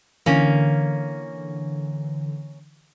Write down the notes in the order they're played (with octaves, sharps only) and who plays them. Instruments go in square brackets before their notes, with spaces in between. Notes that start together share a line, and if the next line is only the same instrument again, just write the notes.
[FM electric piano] D3 E3 [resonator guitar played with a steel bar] A#3 C#4